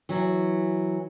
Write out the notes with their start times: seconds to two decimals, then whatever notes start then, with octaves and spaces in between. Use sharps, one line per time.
0.09 E3 F#3